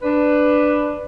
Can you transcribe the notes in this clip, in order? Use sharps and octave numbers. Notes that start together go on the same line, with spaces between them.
D4 B4